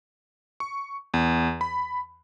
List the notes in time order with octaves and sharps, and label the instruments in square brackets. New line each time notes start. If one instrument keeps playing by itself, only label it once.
[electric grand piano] C#6
E2
B5